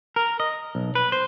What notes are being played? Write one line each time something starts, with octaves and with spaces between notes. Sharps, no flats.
A#4
D#5
B1
B4
C5